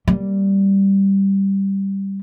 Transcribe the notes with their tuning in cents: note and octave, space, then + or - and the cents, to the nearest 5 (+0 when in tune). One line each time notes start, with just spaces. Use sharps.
G3 +0 A#3 +0